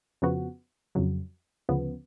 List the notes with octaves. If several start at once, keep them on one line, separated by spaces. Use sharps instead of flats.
F2 C#3 F3 B3 F#4
F2 C#3 F#3
D2 C#3 F3 B3